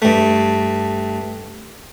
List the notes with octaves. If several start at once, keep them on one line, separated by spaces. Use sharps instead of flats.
G2 A3